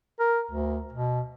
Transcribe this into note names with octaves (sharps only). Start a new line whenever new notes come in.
A#4
D2
B2